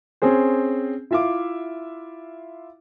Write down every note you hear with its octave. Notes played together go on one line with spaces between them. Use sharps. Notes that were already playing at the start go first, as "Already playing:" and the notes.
C4 C#4 G#4 C5
E4 F4 E5 F5 D6